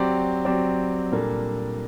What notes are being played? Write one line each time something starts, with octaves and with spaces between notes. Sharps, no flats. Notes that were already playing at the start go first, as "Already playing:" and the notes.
Already playing: F#3 C4 G4 D5
F#3 C4 G4 D5
A#2 G3 A#3 D4 A4